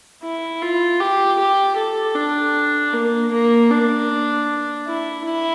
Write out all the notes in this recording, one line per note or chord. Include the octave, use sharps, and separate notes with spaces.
E4
F4
G4
G4
A4
D4
A#3
A#3
D4
E4
E4